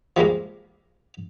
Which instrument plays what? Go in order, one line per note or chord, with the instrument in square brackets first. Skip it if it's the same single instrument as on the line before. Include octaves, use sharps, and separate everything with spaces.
[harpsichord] F3 G3 G#3 A#3